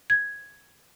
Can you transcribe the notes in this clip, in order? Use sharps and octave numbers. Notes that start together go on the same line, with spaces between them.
G#6